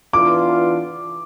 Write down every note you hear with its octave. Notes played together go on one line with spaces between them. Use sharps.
E3 B3 D4 F4 D6